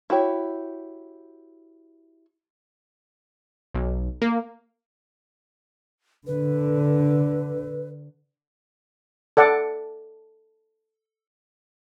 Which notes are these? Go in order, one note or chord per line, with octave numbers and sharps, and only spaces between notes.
E4 F#4 G4 C#5
B1
A#3
D3 B4
A4 D5 F#5